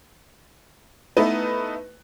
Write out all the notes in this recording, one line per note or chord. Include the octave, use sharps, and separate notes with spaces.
A3 B3 D#4 E4 B4